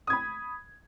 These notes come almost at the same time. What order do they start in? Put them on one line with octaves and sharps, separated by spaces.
D#6 G#6 B5